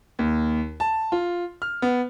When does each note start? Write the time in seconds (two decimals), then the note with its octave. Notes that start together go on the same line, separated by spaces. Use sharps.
0.19 D#2
0.80 A5
1.12 F4
1.62 F6
1.82 B3